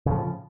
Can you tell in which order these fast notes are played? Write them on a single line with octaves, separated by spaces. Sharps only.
C#3 A2 F3